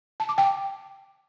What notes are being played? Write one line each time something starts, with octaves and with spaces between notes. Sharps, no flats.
A5
D6
G5